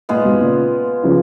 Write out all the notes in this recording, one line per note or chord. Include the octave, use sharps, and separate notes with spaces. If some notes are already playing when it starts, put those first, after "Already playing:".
A#2 G#3 B3 F4
G#2 B2
A#2 C#3
C#3 F3